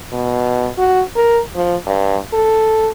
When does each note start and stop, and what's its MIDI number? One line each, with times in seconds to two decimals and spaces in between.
0.12 0.68 47
0.78 1.02 66
1.16 1.40 70
1.56 1.76 53
1.87 2.17 43
2.33 2.90 69